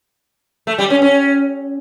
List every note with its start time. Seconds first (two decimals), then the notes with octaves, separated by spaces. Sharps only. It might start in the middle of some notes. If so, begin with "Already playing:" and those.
0.67 A3
0.78 G3
0.90 C#4
1.02 C#4